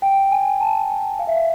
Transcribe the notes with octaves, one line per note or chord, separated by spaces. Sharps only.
G5
G#5
A5
G#5
G#5
F5
E5
F5